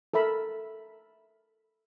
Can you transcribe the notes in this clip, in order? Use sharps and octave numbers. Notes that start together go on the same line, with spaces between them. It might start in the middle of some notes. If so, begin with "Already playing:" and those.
A4 A#4 E5 B5 E6